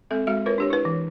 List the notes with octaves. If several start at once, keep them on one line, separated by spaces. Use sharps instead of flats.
G#3 C4 A4 E5
G#3 F#4 E5
F4 A#4 B4 C#5
D4 G4 C#5
E4 B4
E3